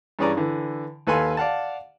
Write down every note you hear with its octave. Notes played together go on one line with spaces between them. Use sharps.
G2 E3 C#4 G#4 D5 A#5
D3 E3
D#2 A4 B4 F5 G#5 C6
D5 F5 F#5 A5